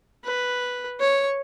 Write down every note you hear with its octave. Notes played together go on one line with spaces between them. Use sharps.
B4
C#5